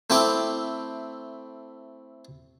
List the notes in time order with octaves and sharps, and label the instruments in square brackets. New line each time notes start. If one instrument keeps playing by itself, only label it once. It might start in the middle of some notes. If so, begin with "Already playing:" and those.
[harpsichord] A3 C4 E4 G5 D6